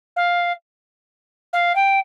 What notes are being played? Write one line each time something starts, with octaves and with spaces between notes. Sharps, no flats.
F5
F5
G5